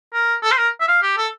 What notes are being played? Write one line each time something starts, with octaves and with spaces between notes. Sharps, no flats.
A#4
A4
C5
A#4
E5
F5
G4
A4